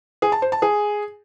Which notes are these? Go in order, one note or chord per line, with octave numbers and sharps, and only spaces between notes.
G#4
A5
C5
A5
G#4